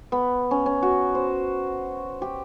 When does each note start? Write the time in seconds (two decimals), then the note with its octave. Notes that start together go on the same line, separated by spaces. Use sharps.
0.12 B3
0.51 C#4
0.66 C#4
0.83 F#4
1.15 C5
2.22 G4